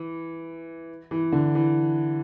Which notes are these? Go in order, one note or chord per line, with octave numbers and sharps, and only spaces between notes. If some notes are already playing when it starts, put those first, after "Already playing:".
Already playing: E3
E3
D3
E3